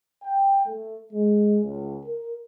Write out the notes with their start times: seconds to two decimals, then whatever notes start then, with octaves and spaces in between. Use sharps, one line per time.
0.24 G5
0.67 A3
1.13 G#3
1.64 C#2
2.06 A#4